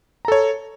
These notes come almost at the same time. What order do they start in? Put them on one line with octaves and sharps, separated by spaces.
A#5 A4 C#5